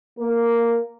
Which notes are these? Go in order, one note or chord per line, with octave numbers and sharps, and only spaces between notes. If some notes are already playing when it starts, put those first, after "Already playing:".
A#3 A#4